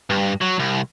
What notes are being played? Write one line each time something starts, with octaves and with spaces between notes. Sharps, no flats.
G2
F#3
C2